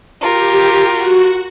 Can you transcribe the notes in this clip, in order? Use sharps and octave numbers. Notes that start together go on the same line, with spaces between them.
F4 G4 A#4
F#4